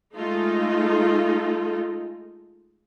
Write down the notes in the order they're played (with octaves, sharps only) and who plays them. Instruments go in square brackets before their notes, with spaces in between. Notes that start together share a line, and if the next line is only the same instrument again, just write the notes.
[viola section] G#3 A3 D#4 F4 A4